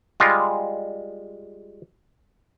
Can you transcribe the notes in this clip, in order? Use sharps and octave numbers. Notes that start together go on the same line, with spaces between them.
G3 G#3 F4